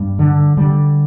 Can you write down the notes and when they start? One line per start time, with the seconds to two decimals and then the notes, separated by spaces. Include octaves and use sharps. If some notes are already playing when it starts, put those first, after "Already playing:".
Already playing: G2 G3
0.19 D3
0.57 D3 G3